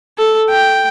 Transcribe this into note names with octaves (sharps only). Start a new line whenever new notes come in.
A4
G5